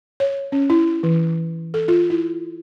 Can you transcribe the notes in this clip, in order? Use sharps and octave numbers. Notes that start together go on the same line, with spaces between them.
C#5
C#4
E4
E3
A4
F4
E4